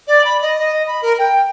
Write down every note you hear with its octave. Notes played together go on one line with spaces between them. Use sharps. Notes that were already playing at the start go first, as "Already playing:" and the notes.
D5
B5
D#5
D#5
B5
A#4
G5